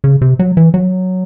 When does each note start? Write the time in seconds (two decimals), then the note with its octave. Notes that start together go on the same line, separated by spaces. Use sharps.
0.04 C#3
0.22 C3
0.39 F#3
0.57 E3
0.74 F#3